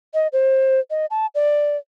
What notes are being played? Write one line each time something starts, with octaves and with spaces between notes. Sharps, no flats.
D#5
C5
D#5
A5
D5